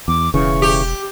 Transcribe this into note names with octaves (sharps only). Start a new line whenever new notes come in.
E2 D6
E1 C#3 E3 C#6
G4